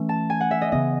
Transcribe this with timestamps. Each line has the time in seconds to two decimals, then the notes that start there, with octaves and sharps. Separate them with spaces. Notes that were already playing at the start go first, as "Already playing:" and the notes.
Already playing: E3 A3 C#4
0.09 A5
0.30 G#5
0.40 F#5
0.51 E5
0.62 D#5
0.72 C#3 E3 B3 D#5